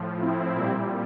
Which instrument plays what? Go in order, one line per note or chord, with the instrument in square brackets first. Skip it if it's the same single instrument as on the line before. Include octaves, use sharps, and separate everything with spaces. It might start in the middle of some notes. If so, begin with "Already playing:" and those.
Already playing: [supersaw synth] A2 F3
C4 E4
A#2 G3